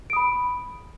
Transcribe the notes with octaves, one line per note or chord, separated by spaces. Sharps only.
B5 D#6 D7